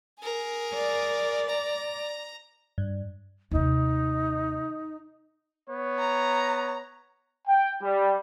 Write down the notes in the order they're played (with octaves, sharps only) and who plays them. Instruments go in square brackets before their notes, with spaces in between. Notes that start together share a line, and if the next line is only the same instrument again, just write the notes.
[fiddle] G#4 A#4
[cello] D5
[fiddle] A#5
[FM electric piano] G2
[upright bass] D#2 C3 [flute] D#4
[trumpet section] B3 C#5
[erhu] A#5
[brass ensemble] G5
G3